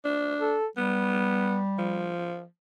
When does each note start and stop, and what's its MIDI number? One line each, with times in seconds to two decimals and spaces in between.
0.05 0.55 62
0.40 0.66 69
0.77 2.15 55
0.77 1.59 59
1.78 2.45 53